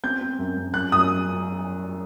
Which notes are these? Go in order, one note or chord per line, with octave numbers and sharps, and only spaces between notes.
C4 G6
C4
F#2
F#2
F#2 F#6
F#2 D#6